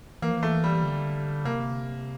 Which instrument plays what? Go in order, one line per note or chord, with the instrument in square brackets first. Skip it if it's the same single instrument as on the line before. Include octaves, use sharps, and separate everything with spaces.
[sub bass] E3 [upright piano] A#3
[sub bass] F3
[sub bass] E3 [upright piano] A3
[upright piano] G3
[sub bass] D3
[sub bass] C3 [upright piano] A#3